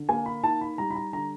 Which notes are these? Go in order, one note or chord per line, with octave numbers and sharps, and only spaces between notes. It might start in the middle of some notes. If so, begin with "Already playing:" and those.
Already playing: D3
A#3 G#5
B5
D#4 A5
B5
G3 A#5
B5
A#5
D3 A#5